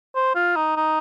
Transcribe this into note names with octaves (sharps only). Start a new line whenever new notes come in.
C5
F4
D#4
D#4